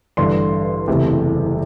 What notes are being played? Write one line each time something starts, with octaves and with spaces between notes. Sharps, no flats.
A1 G2 D3 C6
F#1 E2 C3 E3 A3